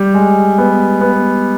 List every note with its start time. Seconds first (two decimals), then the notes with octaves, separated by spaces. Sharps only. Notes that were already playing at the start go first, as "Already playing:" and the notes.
Already playing: G3
0.14 G#3
0.58 B3
1.01 B3